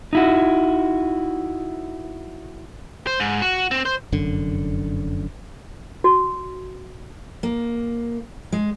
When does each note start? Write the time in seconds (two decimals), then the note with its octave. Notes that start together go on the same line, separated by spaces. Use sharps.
0.13 D#4 E4 F#4
3.07 C5
3.20 G#2
3.42 F#4
3.71 C4
3.85 C5
4.12 F1 F#2 D3
6.04 F#4
7.43 A#3
8.52 G#3